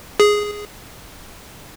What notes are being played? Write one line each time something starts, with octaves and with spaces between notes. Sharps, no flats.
G#4